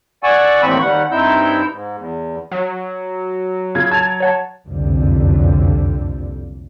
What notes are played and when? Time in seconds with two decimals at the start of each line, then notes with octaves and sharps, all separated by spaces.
0.23 D5 F#5 G#5 C#6 E6
0.62 D#2 A2 E3 C4 B5 C#6
0.81 D#2 G3 F#5
1.11 G2 C4 D#4 E4 E6 G6
1.72 G#2
1.97 E2
2.51 F#3
3.75 C#3 F4 G#6
3.92 A5 G#6 A6 F7
4.20 C#5 F#5 A5
4.66 F#1 C2 F2 D3 G3